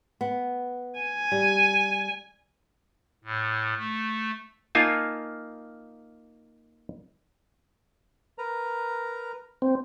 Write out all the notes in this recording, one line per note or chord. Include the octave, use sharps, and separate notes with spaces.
B3
G#5
G3
A2
A3
A#3 D#4 F4 G#5 A5
A#4 B4 A#5
C4